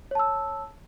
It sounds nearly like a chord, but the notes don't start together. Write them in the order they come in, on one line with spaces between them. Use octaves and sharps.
C#5 A5 E6